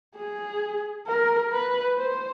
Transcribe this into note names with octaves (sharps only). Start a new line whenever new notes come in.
G#4
A#4
B4
C5